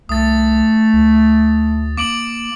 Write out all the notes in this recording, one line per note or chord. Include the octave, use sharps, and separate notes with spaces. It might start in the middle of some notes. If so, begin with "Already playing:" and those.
C2 A3 D#6 A6
D2
A#3 D6 D7 F#7